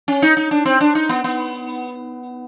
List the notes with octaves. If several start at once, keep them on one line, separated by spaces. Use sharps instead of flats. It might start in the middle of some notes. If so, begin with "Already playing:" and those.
C#4
D#4
D#4
D4
C4
D4
D#4
B3
B3